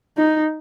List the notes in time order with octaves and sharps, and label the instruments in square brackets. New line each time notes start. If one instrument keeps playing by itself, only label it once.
[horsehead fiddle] D#4